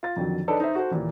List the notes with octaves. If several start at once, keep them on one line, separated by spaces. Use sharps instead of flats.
F4 A6
F2 D3 D#3 F#3
D4 D#4 A4 B4 C#5 D5
D#4 C5 D#5 E5
F#4 A4 C5
D#2 A#2 E3